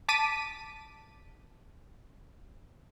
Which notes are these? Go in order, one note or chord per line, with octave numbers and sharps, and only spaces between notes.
A5 D6 B6 D#7